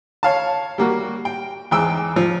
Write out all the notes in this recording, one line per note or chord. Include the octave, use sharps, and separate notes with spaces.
C#5 F5 A5
G3 A#3 F#4
G5
E2 G#2 G5 E6
F3